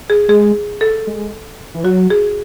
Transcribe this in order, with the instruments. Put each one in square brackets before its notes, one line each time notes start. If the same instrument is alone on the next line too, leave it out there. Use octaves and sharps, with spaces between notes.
[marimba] G#4
[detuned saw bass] G#3 [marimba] G#4
[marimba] A4
[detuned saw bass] G#3
E3
[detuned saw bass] F#3 [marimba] F#4
[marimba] G#4